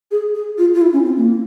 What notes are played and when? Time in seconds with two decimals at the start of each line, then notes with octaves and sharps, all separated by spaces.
0.11 G#4
0.34 G#4
0.58 F4
0.75 F4
0.82 E4
0.93 C#4
1.05 C4
1.17 A#3